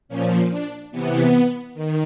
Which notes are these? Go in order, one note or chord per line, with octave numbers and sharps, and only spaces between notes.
A#2 F3 C#4
D4
C3 E3 B3
D#3